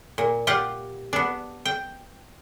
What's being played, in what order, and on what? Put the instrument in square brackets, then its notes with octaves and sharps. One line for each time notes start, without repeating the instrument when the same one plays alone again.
[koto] A#2
F4 G4 F#5
B3 D4
G5